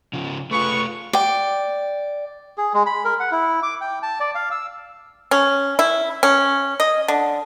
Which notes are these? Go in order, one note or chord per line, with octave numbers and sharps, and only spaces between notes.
C#3 F3
A3 F4 G#4 B4 C#6
D5 G5
G#4
G#3
B5
A#4
F#5
E4
D6
G5
A5
D5
F5
E6
C#4
E4
C#4
D#5
D3